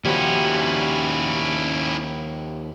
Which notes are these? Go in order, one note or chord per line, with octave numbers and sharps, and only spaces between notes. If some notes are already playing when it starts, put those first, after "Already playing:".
D#2 F3 G3 C#4 E4 F#4